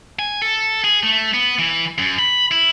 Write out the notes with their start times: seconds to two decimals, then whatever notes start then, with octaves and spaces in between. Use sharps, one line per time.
0.19 G#5
0.42 A4
0.84 G#4
1.03 A3
1.34 B3
1.59 E3
1.98 F#2
2.19 B5
2.51 E4